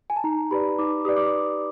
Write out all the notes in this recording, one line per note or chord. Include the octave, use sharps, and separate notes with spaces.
G#5
A5
D#4 A#5
G4 B4 D5 B5
D#4 D6
G4 B4 D5 D#6
D6